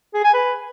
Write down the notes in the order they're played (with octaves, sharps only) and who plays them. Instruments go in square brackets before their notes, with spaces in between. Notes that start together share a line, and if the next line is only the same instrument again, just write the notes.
[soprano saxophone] G#4
G#5
B4